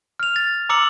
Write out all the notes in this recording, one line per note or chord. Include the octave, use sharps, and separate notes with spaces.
F6 F7
A6
A#5 D6 E6 C#7 F#7